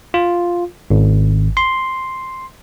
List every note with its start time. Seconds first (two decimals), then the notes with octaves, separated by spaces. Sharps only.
0.14 F4
0.90 G#1
1.57 C6